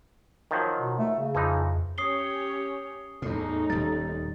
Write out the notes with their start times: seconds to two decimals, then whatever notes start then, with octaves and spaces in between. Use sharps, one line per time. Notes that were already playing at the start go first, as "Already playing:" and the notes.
0.51 D#3 F3 F#3
0.79 B2
0.98 A3
1.19 C#3
1.35 F2 E3 F3 D#4
1.98 C#4 G4 C#5 D#6 C7 G7
3.22 E2 A2 A3 D#4
3.70 D#1 G3 A6